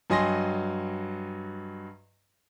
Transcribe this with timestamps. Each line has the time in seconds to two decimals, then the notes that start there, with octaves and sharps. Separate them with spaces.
0.10 G2 F#3 D#5 G#5 C6 A#6